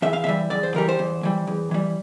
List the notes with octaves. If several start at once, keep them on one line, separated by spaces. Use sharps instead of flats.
E2 E5
F5
E3 G3 E5
E2 D5
C5
E3 G3 A#4
C5
E2
E3 G3
E2
E3 G3